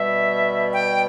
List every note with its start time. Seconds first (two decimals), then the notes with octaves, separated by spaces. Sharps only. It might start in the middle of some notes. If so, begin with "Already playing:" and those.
Already playing: B2 G3 E5
0.73 G5